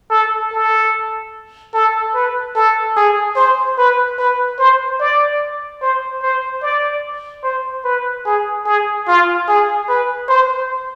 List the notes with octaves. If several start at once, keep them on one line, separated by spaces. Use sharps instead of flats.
A4
A4
A4
B4
A4
G#4
C5
B4
B4
C5
D5
C5
C5
D5
C5
B4
G#4
G#4
F4
G#4
B4
C5